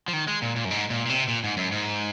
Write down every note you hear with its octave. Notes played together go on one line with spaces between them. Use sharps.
F3
D#3
G#3
A#2
A#2
F#2
G#2
A#2
A#2
C3
A#2
G#2
F#2
G#2